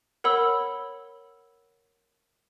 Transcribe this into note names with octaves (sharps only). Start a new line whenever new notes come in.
A#4 C#5 F#5 B5 E6